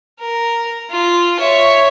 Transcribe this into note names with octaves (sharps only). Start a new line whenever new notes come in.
A#4
F4
C#5 E5